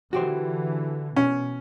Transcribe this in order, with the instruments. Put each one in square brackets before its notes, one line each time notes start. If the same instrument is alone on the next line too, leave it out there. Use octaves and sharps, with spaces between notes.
[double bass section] D3 E3 [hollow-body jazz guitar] F#4 G4 C5
[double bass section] B2 [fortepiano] C#4